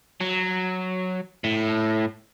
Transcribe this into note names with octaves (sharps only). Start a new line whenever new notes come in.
F#3
A2